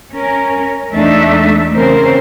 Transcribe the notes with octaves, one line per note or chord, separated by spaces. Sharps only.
C#4 A#4
E2 A3 D4 D#4 E5
C#3 E3 C4 C#4 A#4 C5